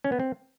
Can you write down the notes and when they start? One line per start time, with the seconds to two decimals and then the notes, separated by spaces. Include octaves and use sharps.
0.04 C#4
0.12 B3
0.20 C4